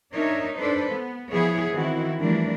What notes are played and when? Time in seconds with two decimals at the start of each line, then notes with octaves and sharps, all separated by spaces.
0.12 D4 D#4 A#4 C#5 E5
0.58 D4 A4 B4 C5
0.91 B3
1.32 F3 B3 E4 G#4 C#5
1.72 D#3 E3 C4 E4 F#4
2.19 E3 F3 G3 A3 D4 A#4